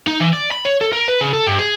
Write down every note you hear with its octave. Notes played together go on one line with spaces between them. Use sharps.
D#4
E3
D5
B5
C#5
A4
A#4
B4
C#3
A4
G2
G#4